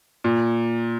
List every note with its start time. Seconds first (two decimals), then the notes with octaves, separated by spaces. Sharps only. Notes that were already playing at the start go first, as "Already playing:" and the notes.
0.24 A#2